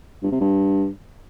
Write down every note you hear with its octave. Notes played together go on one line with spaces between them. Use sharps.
G2
C3
G2